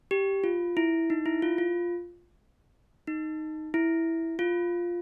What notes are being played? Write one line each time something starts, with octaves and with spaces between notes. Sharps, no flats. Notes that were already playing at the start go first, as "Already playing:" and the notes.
G4
F4
E4
D#4
E4
F4
F4
D#4
E4
F4